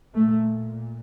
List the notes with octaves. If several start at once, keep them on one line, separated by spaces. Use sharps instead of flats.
A#2 A3